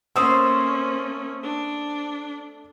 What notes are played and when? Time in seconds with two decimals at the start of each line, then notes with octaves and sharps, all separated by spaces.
0.16 A3 A#3 C4 C#4 C5 D#6 E6
1.43 D4